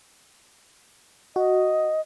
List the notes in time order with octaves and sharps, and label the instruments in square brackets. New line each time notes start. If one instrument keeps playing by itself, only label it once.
[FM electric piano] F#4 [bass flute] D#5